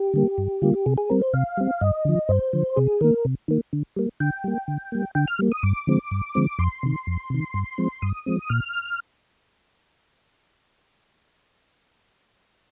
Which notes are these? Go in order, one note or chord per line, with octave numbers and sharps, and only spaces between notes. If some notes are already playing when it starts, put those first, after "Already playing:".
Already playing: G4
D3 G3 A#3
G2
D3 G3 A#3 F4
G4
C3 G#4
G#4
G3 C4 A#4
C5
C3 F5
G3 C4
G2 D#5
D3 F3
G2 C5
D3 F3
C3 G#4
D#3 A#3 A#4
C3
D#3 A#3
D3
G3 A#3
D3 G5
G3 A#3
D3
G3 A#3
D3 G5
F6
G3 A#3
D#6
G2 D6
D3 F3 G#3 C4
G2
D3 F3 G#3 C4
F2 C6
C3 D#3
F2
C3 D#3
G2
F3 G#3 C4
G2 D#6
F3 G#3 C4
A#2 F6